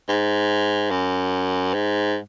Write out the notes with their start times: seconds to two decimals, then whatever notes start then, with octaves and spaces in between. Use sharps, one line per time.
0.08 G#2
0.90 F#2
1.74 G#2